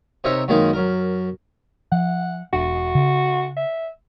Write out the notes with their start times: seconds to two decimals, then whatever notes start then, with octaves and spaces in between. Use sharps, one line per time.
0.24 C3 D#4 A#4 C#5 E5
0.48 F#2 D#3 G#3 A#3 D#4
0.73 F#2 A#4
1.92 F3 F#5
2.53 E1 D4 F#4
2.95 C#3
3.57 E5